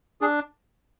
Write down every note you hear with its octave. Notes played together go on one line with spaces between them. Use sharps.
D4 G#4